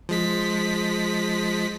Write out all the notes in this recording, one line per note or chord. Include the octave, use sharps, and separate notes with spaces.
F3 G#3 B6